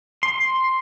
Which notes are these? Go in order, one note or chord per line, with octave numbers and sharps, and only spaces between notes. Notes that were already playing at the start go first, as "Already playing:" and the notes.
C6